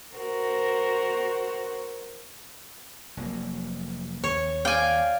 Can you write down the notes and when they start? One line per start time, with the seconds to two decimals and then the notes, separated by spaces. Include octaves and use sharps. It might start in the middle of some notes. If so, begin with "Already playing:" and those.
0.15 F#4 A#4 C5
3.17 F1 F#3 A#3
4.24 D#2 C#5
4.65 D5 F5 G5 G#5